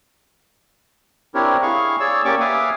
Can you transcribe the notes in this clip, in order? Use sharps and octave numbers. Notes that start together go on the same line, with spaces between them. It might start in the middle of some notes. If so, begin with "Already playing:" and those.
C4 D4 E4 G4 A#4 C#5
E4 G#4 F5 C#6
G#4 C#5 D5 E6
A#3 C#4 G4 D5 C#6 D6
B4 E5 F5 G#5 D6 D#6